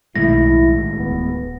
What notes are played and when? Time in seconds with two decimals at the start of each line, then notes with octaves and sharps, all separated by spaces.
0.16 B1 A2 D#3 G#3 E4 A#6
0.98 D1 B3